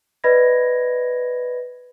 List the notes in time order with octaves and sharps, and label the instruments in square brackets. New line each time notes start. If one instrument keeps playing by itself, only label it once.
[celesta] B4 D5 D#5 B5 G#6 A#6